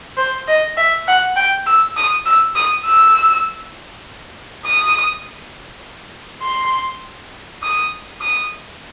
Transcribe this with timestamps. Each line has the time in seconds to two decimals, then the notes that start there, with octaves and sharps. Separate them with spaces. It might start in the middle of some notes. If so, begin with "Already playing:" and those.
0.17 C5
0.48 D#5
0.77 E5
1.07 F#5
1.36 G5
1.66 E6
1.96 D#6
2.26 E6
2.55 D#6
2.85 E6
4.65 D#6
6.42 C6
7.62 D#6
8.21 D#6